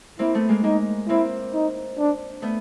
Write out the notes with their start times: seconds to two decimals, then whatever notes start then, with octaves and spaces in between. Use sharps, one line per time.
0.19 A#3 C4 E4
0.34 A3 B3
0.49 G#3 A#3
0.63 G#3 A#3 D#4
1.08 A#3 C4 E4
1.53 D#4
1.98 D4
2.42 A3 B3